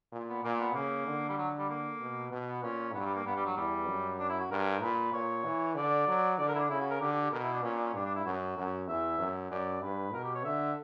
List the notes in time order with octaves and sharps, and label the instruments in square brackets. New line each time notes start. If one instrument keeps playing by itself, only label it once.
[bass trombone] A#2
[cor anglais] B3
[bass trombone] A#2 [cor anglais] A#3
[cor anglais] B3
[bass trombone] C#3 [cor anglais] A#3
[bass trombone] D3
[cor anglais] G3
F#3
G3
A#3
[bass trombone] B2
B2
[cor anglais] B3
[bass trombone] A#2 [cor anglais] C#4
[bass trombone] G2 [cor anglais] B3
[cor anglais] F#3
G3
A#3
[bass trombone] G2 [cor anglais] B3
[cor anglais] G3
F#3
[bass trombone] E2 [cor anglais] G3
[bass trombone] F#2
[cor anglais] D4
E4
F#4
[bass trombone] G2 [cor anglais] A#4
[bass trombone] A#2 [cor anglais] B4
[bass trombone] A#2 [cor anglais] C#5
[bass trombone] E3
[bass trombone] D3 [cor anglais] D5
[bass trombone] F#3
[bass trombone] D3 [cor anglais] D5
[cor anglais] A#4
E4
D4
[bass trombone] C#3 [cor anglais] E4
[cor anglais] F#4
A#4
[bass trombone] D3 [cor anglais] G4
[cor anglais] G4
G4
[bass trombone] B2 [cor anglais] A#4
[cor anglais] E4
D4
[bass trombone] A#2 [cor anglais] C#4
[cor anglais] D4
C#4
[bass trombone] G2 [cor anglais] D4
[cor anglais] D4
E4
[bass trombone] F#2 [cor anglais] F#4
[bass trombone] F#2
[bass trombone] E2 [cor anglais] E5
[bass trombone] F#2
[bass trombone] F#2 [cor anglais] D5
[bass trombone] G2 [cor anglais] B4
[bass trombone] B2 [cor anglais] A#4
[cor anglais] G4
C#5
[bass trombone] D3 [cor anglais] E5